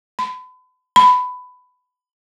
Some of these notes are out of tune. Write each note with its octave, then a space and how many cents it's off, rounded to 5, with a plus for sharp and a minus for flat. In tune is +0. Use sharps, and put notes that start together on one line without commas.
B5 +35
B5 +15